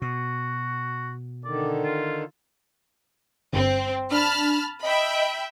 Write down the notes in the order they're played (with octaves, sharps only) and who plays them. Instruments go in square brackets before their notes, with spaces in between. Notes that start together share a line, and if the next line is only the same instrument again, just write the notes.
[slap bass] B2 [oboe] F#4
[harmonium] D3 D#3 [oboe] D5
[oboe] F4
[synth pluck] G1 G2 [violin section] C4
[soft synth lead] D4 [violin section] A5 B5 F6
[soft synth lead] D#5 [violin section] E5 G5 B5